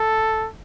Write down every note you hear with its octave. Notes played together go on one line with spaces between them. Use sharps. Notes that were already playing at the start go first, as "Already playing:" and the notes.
Already playing: A4